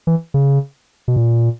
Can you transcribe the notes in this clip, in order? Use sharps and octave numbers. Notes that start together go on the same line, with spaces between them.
E3
C#3
B2
A#2